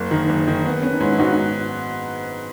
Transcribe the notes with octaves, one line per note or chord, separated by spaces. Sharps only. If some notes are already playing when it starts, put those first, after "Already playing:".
Already playing: F#1
D#3 D#4
F#1
D#3
B3
B3 C#4
D#4
G#2 C#4 E4
E4
G#2 D#4 F#4
F#4